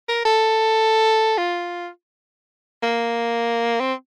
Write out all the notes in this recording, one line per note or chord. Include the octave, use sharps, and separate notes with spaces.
A#4
A4
F4
A#3
C4